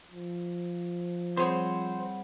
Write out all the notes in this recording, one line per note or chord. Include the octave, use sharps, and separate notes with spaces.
F3
G3 C4 G#4 C5 C#5 F#5 B5